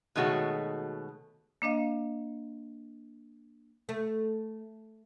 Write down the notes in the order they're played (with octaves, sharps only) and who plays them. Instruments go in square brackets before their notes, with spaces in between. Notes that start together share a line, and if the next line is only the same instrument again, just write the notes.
[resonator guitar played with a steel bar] B2 D#3 G#3 A3 F#4 C#5
[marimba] A#3 D4 D#5 F5
[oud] A3